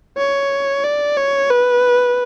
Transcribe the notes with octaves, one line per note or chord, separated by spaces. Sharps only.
C#5
D5
C#5
B4